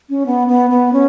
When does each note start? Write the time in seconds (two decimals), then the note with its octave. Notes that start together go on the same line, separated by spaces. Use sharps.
0.09 C#4
0.26 B3
0.48 B3
0.70 B3
0.93 C#4